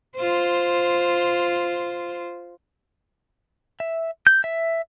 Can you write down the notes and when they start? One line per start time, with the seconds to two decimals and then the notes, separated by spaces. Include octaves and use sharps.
0.16 F4 C5
3.80 E5
4.27 G6
4.44 E5